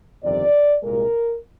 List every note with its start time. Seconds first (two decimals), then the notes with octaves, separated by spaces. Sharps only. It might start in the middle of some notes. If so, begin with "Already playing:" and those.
0.23 G1 F2 C3 D#3 G3 D5
0.82 C2 A#2 G#3 A#4